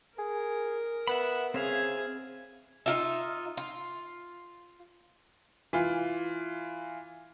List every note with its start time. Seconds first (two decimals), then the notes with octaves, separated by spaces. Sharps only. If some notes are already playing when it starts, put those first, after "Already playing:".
0.18 G#4 A#4
1.08 B3 E5 F#5 B5
1.54 C#3 C4 G#4 E5 F5 G#5
2.86 D#4 F4 E5
3.57 F4
5.73 E3 F4